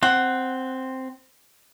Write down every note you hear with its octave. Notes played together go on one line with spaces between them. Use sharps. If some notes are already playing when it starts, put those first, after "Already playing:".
C4 F#5